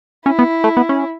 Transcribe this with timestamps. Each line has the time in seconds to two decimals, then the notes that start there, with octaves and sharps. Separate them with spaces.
0.26 C#4 E4
0.39 B3
0.64 A3
0.77 B3
0.89 C#4